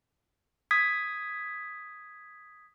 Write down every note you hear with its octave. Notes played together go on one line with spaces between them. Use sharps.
D#6 G#6 B6